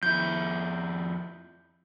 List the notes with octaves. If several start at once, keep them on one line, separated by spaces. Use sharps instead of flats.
F2 E4 G6